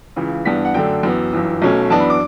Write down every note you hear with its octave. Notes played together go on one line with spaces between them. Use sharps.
C#2 C#3 E3
G2 E3 B3 D4 B6
F#5
F#2 D3 A3 D4 G5
F#2 E3 B3
G1 F#2 E3
B1 B2 A3 C#4
F#2 E3 B3 D4 A5
B5
D6